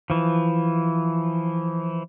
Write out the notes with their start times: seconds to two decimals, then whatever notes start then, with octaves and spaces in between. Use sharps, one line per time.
0.10 E3 F3